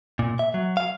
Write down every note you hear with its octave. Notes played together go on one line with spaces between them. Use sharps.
A#2
E5
F#3
F5